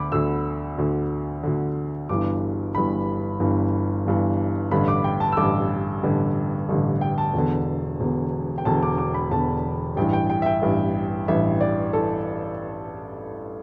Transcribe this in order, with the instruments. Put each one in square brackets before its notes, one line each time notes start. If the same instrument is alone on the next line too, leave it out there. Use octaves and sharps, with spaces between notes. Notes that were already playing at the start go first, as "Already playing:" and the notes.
Already playing: [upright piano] D2 D3 B5 D6
D2 D3 E6
D2 D3
D2 D3
G1 G2 E3 D6
G1 G2 E3 B5
G1 G2 E3
G1 G2 E3
A1 G2 D3 B5
D6
G5
A5
E6
A1 G2 D3 D6
A1 G2 D3
A1 G2 D3
G5
A5
E1 E2 D3
E1 E2 D3
G5
E1 E2 D3 A5
D6
D6
B5
E1 E2 D3 A5
A1 G2 E3 G5
G5
G5
E5
G5
A1 G2 E3
A1 G2 E3 E5
D5
E3 A4